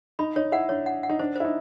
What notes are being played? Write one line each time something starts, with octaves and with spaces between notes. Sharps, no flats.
D#4 B5
D#4 C#5
E4 F#5
D4 C#5
F#5
F#5
D#4
D4 C5
E4 C5
D#4